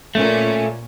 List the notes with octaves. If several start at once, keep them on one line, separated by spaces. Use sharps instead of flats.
A#2 A3 C#4